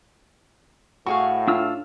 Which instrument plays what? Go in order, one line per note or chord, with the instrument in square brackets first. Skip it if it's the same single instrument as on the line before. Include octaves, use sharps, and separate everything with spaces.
[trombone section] A2 [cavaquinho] F#4 G#4 F5 [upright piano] C#6
[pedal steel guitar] D4 E6 F6 [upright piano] F4